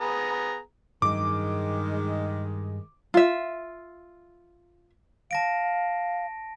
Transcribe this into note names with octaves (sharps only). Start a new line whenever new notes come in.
B3 G#4 A#5
G2 D#3 F#3 G#3 D6
F4 E5
F5 A5 A#6 D7